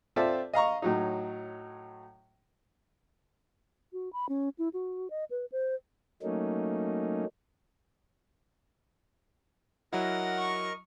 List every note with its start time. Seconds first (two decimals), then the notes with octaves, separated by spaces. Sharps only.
0.16 C4 F4 A4 D5 E5 A5
0.53 D#5 F5 A#5 C#6
0.82 A2 F#3 D#4
3.93 F#4
4.13 B5
4.29 C#4
4.59 E4
4.74 F#4
5.10 D#5
5.31 B4
5.52 C5
6.22 F#3 A3 A#3 C#4 D#4
9.93 F#3 E4 A#4 D#5 F#5 F6
10.38 C#6